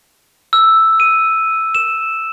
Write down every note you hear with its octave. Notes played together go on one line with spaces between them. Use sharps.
E6
D#7
E7